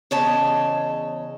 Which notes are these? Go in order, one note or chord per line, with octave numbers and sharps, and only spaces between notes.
E2 C#3 C#5 D#5 A5